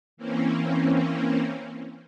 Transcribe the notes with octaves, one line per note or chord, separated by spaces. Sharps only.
E3 A#3 C4 C#4